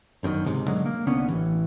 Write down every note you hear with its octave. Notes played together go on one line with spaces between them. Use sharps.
G1 F#2 B2 D#3
C#2 G#2 C3
B2 D3 F#3 G#3
A#3
C2 D3 B3 C#4
A1 E3